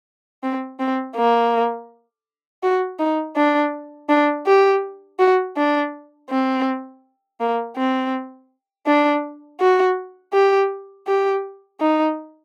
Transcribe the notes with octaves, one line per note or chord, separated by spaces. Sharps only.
C4
C4
A#3
F#4
D#4
D4
D4
G4
F#4
D4
C4
A#3
C4
D4
F#4
G4
G4
D#4